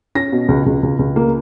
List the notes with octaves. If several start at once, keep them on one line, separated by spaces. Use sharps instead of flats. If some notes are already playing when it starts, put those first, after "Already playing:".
C#4 A#6
B2
C#2
C#2
C#2
C#2
A#3